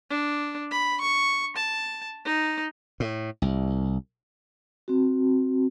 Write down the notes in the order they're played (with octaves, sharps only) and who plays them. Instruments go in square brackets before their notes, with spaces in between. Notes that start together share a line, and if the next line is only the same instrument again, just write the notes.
[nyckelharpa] D4
B5
C#6
A5
D#4
[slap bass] A2
C2
[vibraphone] C4 F#4